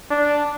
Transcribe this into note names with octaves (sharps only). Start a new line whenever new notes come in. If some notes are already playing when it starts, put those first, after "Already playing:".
D4